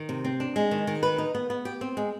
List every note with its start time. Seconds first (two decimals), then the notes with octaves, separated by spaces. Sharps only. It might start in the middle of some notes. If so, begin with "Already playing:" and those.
Already playing: D#3
0.09 C3
0.24 C4
0.40 D4
0.56 G#3
0.71 D#3
0.87 D#3
1.03 B4
1.18 D#4
1.35 B3
1.50 B3
1.65 G4
1.81 C4
1.97 G#3